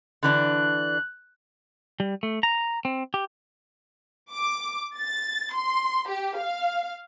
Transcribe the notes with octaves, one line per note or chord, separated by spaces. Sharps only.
D3 E3 D4 F#6
G3
A3
A#5
C4
G4
D6
A6
C6
G4
F5